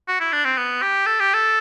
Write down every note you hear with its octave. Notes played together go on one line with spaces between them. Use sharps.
F#4
E4
D4
C4
B3
G4
A4
G4
A4